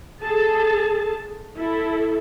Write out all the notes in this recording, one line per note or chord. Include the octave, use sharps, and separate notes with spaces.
G#4 A4 A5
E4 A4